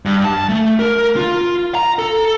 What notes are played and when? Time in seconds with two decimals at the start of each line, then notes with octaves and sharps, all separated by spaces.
0.05 G2
0.25 A5
0.49 A3
0.80 A#4
1.17 F4
1.75 A#5
1.99 A4